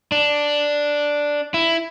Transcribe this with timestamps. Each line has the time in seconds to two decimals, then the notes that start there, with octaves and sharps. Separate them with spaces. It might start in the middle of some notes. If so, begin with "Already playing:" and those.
0.12 D4
1.54 E4